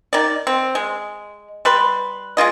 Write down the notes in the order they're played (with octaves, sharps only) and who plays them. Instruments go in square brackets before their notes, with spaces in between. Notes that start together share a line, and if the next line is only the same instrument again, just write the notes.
[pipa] D#3 D5
C4
G#3
G3 B4 C6
G#3 C#4 F4 D#5